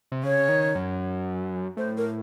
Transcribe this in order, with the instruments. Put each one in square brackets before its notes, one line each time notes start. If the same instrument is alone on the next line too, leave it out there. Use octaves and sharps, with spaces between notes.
[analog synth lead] C3
[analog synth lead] C#3 [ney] C#5
[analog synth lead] D#3
F#2
[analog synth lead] A2 [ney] C5
[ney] A#4